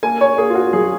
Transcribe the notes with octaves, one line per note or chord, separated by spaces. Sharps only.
A#3 G#5
C#5
A#3 G#4
F4
F#4
F#2 G#4